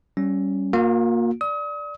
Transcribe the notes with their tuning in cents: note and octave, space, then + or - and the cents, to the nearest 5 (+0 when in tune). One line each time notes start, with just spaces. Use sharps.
G3 -15 C#4 +0
A#3 +0 F4 +45
D5 +0 D#6 +40